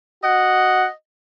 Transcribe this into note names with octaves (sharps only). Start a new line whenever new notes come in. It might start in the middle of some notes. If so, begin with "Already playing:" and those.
F#4 D#5 F#5